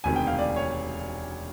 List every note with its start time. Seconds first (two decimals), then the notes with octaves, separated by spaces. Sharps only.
0.04 E1 D2 C3 D#3 G#5
0.16 G5
0.27 F5
0.39 D5
0.56 C#5